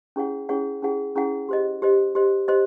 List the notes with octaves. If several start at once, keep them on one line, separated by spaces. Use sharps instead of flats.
C#4 E4 G#4 C#5 F#5
C#4 E4 G#4 C#5 F#5
C#4 E4 G#4 C#5 F#5
C#4 E4 G#4 C#5 F#5
G4 C5 D#5
G4 C5 D#5
G4 C5 D#5
G4 C5 D#5